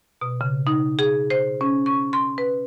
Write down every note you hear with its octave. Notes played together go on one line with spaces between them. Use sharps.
B2
C#3
D#4
G#4
C5
C#4
C#6
C6
B4